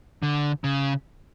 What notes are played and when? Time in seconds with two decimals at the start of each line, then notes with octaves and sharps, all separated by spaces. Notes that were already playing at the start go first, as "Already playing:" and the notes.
0.23 D3
0.64 C#3